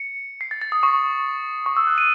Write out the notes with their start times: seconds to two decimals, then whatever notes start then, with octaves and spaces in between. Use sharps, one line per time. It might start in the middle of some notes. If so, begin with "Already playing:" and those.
Already playing: C#7
0.41 C7
0.51 A6
0.61 A6
0.72 D#6
0.83 C#6
1.66 C#6
1.77 E6
1.87 F#6
1.98 D#7